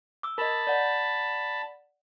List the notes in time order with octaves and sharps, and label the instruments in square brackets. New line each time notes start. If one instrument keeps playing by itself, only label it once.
[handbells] D6 E6
[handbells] A#4 D#5 [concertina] A5 B5
[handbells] D5 F#5